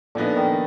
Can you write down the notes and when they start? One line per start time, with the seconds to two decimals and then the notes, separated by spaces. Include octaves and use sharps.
0.15 A#2 D3 F3 B3 D#4
0.37 D#3